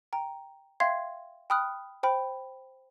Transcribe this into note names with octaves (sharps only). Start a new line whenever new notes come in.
G5 A#5
E5 F5 G5 C6 G#6 C7
G5 B5 D#6 F6 F#6
C5 G5 B5